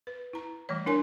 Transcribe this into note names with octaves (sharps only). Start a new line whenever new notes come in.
B4
E4 A#5
E3 G3 A3 C#5
D4 E4 A#4 C#5 G#5 C6